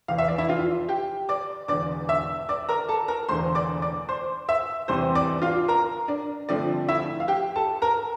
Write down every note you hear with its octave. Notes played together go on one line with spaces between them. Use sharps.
F1 E2 E3 F5
E5
D5
E4 E5
F4 F5
G4 G5
D5 D6
E1 E2 D3 D5 D6
E5 E6
D5 D6
A#4 A#5
A4 A5
A#4 A#5
E1 E2 D3 A3 C5 C6
D5 D6
D5 D6
C5 C6
E5 E6
E2 C3 E3 G3 C5 C6
D5 D6
F4 F5
A#4 A#5
D4 D5
G2 D3 F3 A3 C4 D4 D5
E4 E5
F5
G4 G5
A4 A5
A#4 A#5